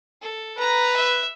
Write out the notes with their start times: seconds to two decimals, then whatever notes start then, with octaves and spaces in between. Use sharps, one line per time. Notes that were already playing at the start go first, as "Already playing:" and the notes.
0.22 A4
0.59 B4 A#5
0.96 E5